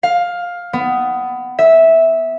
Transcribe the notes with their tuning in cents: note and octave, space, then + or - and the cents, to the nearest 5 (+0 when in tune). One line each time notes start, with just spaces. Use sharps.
F5 +10
B3 +20
E5 -10